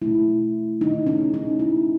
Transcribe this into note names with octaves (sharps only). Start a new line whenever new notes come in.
B2 A3 E4
D#4
C#4
D#4
E4